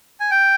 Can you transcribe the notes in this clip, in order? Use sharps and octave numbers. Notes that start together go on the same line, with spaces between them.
G#5
G5